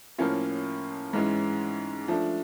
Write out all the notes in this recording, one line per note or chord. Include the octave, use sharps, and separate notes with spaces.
A2 F3 A#3 C#4 F4
G#2 E3 G#3 C#4
F3 A3 D4